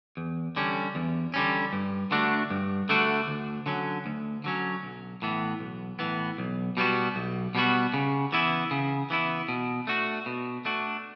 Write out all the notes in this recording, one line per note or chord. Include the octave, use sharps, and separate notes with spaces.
E2
D3 G3 C#4
E2
D3 G3 C#4
G2
D3 A3 D4 F#4
G2
D3 A3 D4 F#4
D2
D3 F#3 C#4
D2
D3 F#3 C#4
B1
A2 E3 B3
B1
A2 E3 B3
B1
B2 G3 B3 F#4
B1
B2 G3 B3 F#4
C#3
E3 B3 E4
C#3
E3 B3 E4
B2
A3 D4 F#4
B2
A3 D4 F#4